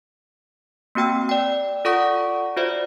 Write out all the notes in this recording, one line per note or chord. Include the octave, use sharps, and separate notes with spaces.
A#3 C4 F#4 G5 E6
D5 G5
F4 A4 D5 F#5 C#6 D#6
F4 F#4 C5 D5 E5